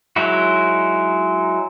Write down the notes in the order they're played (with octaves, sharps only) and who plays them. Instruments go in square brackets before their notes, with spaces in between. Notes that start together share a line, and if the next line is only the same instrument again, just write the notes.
[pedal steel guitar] F#3 G#3 D#4 E4 F#4